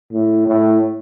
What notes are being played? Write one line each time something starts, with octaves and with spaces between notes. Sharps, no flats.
A2
A2